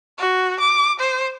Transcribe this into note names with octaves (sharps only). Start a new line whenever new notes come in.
F#4
D6
C5